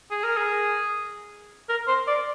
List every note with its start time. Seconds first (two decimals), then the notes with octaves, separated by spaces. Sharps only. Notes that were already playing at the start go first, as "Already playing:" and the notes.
0.11 G#4
0.24 A#4
0.37 G#4
1.69 A#4
1.88 C5
2.07 D5